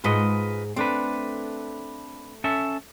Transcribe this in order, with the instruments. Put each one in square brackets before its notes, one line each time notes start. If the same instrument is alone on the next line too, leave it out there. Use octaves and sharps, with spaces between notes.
[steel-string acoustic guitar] G#2 G#3 [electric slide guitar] F4 B4 D#5
[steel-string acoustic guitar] A3 [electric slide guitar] C4 D4 B4
[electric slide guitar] C#4 A4 E5